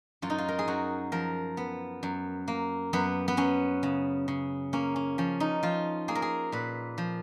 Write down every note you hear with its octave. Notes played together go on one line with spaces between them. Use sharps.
F#2 F4
D#4
F4
A#4
G#4
F#2 F#4
F3 A#4
B3
F#2
A#3
F#2 B3
B3
F#2 C#4
C#3
C#3
A#3 C#4
C#4
F3 C#4
D#4
F3 F4
A#3 G#4
A#4
G#4
A#2 B4
F3